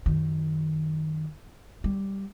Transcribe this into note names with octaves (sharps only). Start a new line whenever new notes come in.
F#2 D#3
G3